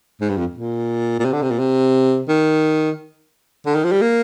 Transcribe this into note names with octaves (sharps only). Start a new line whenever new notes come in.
G#2
G2
F2
A#2
A#2
C3
D3
C3
A#2
C3
D#3
D3
D#3
F3
G3
A#3